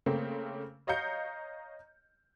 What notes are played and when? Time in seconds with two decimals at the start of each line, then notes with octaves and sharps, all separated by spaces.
0.06 C#3 A3 A#3 C4
0.87 C#5 D#5 F5 A#5 G6 C#7